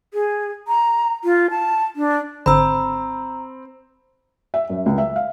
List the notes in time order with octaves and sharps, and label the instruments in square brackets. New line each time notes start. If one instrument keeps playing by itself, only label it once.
[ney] G#4
A#5
F4
A5
D4
[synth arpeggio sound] G#1 D3 [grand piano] C4 [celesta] A#5 [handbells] B5 E6
[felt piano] E5
F#2
C#2
E5
F5